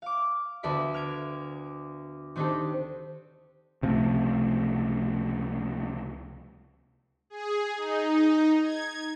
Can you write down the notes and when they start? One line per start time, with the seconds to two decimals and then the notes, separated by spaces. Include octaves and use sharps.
0.02 F5 D6
0.63 D2 B3 A4 D5 E5 B6
0.94 F6 G#6 D7
2.36 D#3 C4 D4 D#4 G4 A4
3.82 C#2 C3 F3 A3
7.30 G#4
7.78 D#4
8.62 G#6